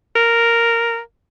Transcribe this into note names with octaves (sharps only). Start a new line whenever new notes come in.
A#4